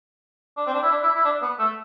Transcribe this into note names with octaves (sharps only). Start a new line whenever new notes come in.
D4
C4
D4
E4
D4
E4
E4
D4
B3
A3